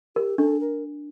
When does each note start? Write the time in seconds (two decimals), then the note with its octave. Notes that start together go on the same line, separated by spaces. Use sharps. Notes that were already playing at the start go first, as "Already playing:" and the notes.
0.16 G4 A#4
0.38 D4 A4
0.60 A#4